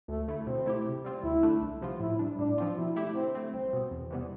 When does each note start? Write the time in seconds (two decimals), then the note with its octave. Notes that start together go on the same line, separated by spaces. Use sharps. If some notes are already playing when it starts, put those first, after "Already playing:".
0.08 D2 A3
0.28 D3 A3 E4
0.47 B2 C4
0.66 A3 E4 G4
0.86 C3
1.05 G3 C4 F4
1.23 D2 E4
1.43 D3 A3 D4
1.62 C2
1.81 C3 F3 B3 F4
2.00 A2 E4
2.19 G3 D4
2.38 A2 D4
2.58 F3 C4 F4
2.77 B2 E4
2.96 A3 E4 G4
3.15 D3 C4
3.35 A3 C4
3.53 C2 C4
3.73 B2 B3
3.91 E2
4.10 C3 E3 G3 B3